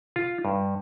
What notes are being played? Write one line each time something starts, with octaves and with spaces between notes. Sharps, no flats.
F4
G2